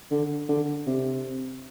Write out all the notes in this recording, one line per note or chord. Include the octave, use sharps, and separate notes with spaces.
D3
D3
C3